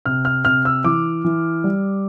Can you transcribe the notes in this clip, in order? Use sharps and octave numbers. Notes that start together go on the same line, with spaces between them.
C3 F6
F6
C3 F6
E6
E3 D6
E3
G3